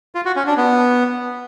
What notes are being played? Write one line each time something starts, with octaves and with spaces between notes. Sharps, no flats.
F4
F#4
C#4
D4
B3